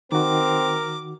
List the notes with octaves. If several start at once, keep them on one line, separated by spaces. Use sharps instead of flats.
D#3 C4 F#4 A#4 D6